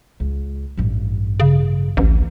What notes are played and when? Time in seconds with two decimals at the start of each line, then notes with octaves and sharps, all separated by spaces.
0.20 C#2
0.77 A1 G2
1.40 C#3
1.97 A1 D2